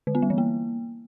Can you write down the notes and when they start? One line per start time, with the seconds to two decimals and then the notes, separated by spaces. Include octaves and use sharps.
0.07 D3
0.15 B3
0.22 G3
0.30 E3
0.38 A#3